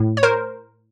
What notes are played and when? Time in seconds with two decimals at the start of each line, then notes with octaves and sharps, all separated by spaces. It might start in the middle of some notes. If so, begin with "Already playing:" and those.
Already playing: A2
0.17 C#5
0.23 A#4 C5